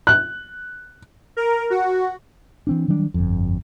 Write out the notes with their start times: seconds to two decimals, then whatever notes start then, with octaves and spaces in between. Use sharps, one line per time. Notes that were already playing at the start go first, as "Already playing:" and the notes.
0.07 F#6
1.37 A#4
1.70 F#4
2.67 E3 C4 D4
2.88 D#3 F#3 G3 D4
3.14 G1 F2